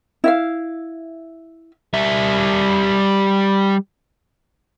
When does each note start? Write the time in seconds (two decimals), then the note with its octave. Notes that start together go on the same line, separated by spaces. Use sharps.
0.24 E4 E5 F5
1.94 G3 E5